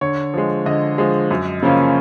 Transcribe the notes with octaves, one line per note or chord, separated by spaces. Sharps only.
D3 C#5
F3 G#3
D3 D#5
F3 G#3
F#2
C#3 F3 A#3 C#4